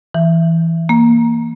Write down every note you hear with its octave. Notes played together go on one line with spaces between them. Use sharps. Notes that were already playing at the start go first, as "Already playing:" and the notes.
E3
A#3